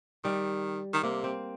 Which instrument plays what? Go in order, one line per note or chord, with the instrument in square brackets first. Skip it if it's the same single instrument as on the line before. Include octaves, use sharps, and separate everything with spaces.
[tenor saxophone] D#3 [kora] G3
[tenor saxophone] D#3
[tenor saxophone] C3 [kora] A#3
[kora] C4